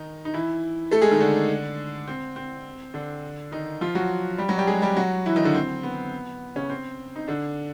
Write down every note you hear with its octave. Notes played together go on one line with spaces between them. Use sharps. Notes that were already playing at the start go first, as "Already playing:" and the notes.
Already playing: D#3 D#4
D#4
E3 E4
A3 A4
G#3 G#4
D#3 D#4
D3 D4
C4
C4
D3 D4
D#3 D#4
F3 F4
F#3 F#4
G3 G4
F#3 F#4
G3 G4
G#3 G#4
G3 G4
F#3 F#4
E3 E4
D#3 D#4
D3 D4
C4
B3
C#3 C#4
C4
D#4
D3 D4